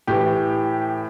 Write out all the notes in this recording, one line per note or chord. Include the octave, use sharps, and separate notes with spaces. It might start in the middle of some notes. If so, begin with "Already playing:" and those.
A2 E3 G4